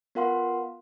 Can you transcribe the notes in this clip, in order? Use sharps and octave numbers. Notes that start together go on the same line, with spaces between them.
B3 F4 A#4 F5 F#5 C6